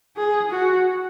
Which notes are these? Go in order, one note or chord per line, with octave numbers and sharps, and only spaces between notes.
G#4
F#4